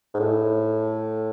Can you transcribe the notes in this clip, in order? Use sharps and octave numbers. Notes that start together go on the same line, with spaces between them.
G#2
A2